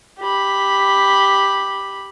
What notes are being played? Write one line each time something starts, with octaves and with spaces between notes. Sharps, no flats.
G4 B5